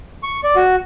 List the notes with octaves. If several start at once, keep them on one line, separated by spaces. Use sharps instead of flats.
C#6
D5
F#4